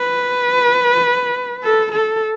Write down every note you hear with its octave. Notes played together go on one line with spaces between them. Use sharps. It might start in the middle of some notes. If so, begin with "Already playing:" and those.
Already playing: B4
A4
A4